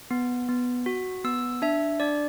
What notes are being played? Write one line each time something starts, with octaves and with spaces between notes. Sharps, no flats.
B3
B3
F#4
B3 E6
D4 E5
D4 D5